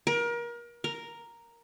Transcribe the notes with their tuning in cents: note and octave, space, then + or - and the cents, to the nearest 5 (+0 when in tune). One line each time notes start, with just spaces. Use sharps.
A#4 +30
A#4 +0